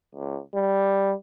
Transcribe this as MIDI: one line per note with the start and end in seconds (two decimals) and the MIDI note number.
0.15 0.39 37
0.55 1.13 55